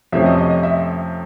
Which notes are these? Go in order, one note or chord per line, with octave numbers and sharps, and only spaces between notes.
F2 C3 F3 A3 C#4 E5
D#5
D#5
D#5
E5